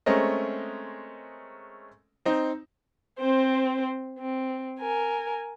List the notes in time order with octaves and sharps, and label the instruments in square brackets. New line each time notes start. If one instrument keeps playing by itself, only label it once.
[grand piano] G#3 A3 C4 C#4 A#4 D#5
C4 D#4
[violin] C4 C5
C4
A#4 G#5